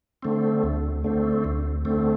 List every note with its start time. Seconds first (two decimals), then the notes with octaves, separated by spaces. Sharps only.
0.23 D3 A3 C4
0.64 D2
1.04 D3 A3 C4
1.44 D2
1.85 D3 A3 C4